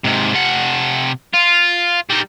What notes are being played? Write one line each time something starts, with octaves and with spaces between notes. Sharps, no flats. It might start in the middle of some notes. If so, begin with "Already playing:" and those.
G#2 C3
C3 F#5
F4
G3 D#4